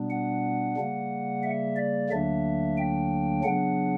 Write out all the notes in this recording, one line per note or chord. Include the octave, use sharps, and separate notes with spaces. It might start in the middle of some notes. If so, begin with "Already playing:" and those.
Already playing: B2 G3 B3 D4
F#5
C#3 G3 A#3
E5
D5
D2 D3 F#3 A#3 D4 E5
G5
C#3 F#3 B3 D4 F#5